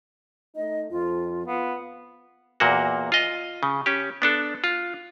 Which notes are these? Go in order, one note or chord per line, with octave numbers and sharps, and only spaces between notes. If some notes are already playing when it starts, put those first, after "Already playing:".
A3 D#4 D#5
F2 F4
B3 F4 F5
E2 A#2 A#3 F#4
F4 D#5
C#3
C#4 G4
B3 D4 A4
F4